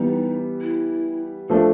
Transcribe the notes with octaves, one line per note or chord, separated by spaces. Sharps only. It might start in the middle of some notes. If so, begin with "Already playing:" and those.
Already playing: E3 G3 B3 D#4
E4
F3 A3 D4 A4